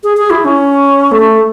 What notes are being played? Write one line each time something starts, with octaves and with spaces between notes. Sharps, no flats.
G#4
G#4
E4
C#4
A3